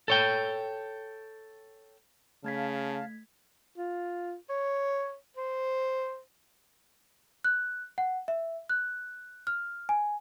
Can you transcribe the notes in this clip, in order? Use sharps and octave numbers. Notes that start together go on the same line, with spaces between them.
A4 C#5 G5
C#3 A3 F5 A5 G#6 B6
F4
C#5
C5
F#6
F#5
E5
F#6
F6
G#5